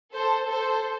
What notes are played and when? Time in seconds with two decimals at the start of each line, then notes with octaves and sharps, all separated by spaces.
0.14 A4 C5
0.51 A4 C5